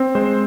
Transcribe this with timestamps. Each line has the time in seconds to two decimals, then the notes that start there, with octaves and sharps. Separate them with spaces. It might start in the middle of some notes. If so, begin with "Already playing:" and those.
Already playing: C4
0.15 G#3 C5